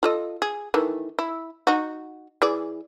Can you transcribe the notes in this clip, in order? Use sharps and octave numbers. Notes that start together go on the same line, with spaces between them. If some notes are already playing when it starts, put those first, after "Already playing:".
F4 A4 D#5
G#4
D#3 E3 A3
E4
D#4 F#4
E3 G#4 D5